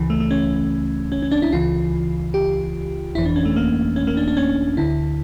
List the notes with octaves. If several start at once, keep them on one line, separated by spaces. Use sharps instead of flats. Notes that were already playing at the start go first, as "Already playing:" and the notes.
Already playing: C#2 C#3 E3
A3
A3
C#4
C#4
C#4
D4
E4
C#2 C#3 E3 F4
G4
G1 F2 E3 E4
D4
C#4
A3
A#3
C#4
A#3
D4
D4
C#4
D2 D3 E4